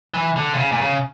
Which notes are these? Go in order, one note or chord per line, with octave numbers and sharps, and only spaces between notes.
E3
D3
A#2
C#3
A#2
C#3